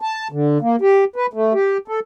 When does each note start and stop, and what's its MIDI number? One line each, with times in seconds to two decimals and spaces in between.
0.01 0.28 81
0.32 0.58 50
0.61 0.76 58
0.81 1.04 67
1.16 1.26 71
1.33 1.53 57
1.54 1.77 67
1.88 2.00 69